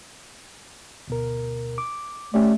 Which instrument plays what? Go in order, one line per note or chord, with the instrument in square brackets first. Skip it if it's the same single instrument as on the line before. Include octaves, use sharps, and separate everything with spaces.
[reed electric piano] D2 B2 A#4
D6
[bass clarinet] A3 [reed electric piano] C#4 G4 D5